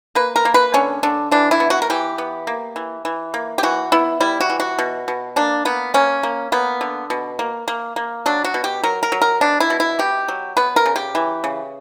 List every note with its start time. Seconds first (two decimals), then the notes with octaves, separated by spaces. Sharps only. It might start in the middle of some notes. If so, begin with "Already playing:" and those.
0.15 A#3 B4
0.36 A#4
0.45 A#3
0.54 B4
0.74 D3 C#4
1.03 D3 D4
1.31 E3 D4
1.51 E4
1.60 B3
1.70 F#4
1.82 A#4
1.90 E3 G4
2.18 B3
2.47 A#3
2.76 E3
3.05 E3
3.34 A#3
3.58 G4
3.63 E3 F#4
3.92 B3 E4
4.20 G3 E4
4.40 F#4
4.50 E3
4.60 F#4
4.79 B2
5.08 B2
5.36 A#3 D4
5.65 A#3 B3
5.94 A#3 C#4
6.23 A#3
6.52 A#3 B3
6.81 D3
7.10 B2
7.39 A#3
7.68 A#3
7.96 A#3
8.26 F#3 D4
8.44 F#4
8.54 B2
8.64 G4
8.83 F#3 A#4
9.03 A#4
9.12 F#3
9.22 A#4
9.41 B2 D4
9.60 E4
9.70 B2
9.80 E4
9.99 B2 G4
10.28 F#3
10.57 B3 B4
10.76 A#4
10.86 C#3
10.96 G4
11.15 E3
11.44 C#3